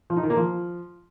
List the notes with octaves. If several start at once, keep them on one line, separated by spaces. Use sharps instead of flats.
F3
D#4
D#3
A#3
F3